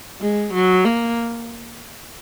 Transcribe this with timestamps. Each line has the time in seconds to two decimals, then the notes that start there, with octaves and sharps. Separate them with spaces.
0.21 G#3
0.54 F#3
0.85 A#3